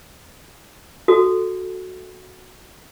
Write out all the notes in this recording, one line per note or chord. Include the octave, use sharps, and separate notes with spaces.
F#4 A4